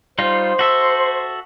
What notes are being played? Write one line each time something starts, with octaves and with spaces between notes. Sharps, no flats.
G3 D#4 F4 C5
F#4 A4 E5